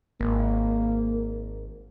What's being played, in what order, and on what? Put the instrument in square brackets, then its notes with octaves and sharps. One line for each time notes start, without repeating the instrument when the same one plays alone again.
[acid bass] G#1 [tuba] A#3